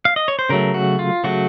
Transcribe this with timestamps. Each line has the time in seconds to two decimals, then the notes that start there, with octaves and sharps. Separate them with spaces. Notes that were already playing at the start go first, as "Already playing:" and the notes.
0.05 F5
0.16 D#5
0.28 C#5
0.39 C5
0.49 C#3 F#3 A3 A#4
0.74 F#4
0.99 F4
1.24 C#3 F#3 A3 F#4